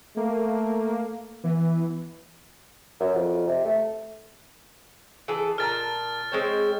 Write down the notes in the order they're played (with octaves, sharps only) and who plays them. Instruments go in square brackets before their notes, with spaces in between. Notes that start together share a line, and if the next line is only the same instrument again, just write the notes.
[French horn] A3 [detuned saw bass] A#3
[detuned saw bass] E3 [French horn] B3
[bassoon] F#2
F2
C3
A3
[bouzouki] E3 G#4 A4
[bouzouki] A#2 A5 A#5 [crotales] F6 A6
[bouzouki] G#3 C4 C#5